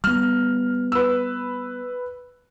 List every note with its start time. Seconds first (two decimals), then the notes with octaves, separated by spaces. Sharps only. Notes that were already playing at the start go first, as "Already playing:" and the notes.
0.04 G3 B3 F6
0.92 B4 E6